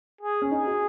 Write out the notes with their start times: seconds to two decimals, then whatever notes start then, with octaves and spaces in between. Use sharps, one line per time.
0.21 G#4
0.42 C#4
0.51 D#4 G#4
0.67 F#4